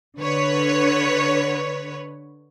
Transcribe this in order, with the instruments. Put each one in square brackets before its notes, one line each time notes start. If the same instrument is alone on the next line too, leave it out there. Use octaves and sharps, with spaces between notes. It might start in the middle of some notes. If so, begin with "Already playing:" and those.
[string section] D3 B4 C#5